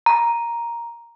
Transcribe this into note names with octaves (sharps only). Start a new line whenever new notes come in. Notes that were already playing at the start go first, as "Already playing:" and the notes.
A#5